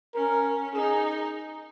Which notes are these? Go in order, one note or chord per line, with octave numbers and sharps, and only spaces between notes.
C#4 A#4
D#4 G#4